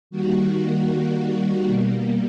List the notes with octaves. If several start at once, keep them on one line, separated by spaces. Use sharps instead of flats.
D#3 G3 A#3 F#4
B2 G3 A#3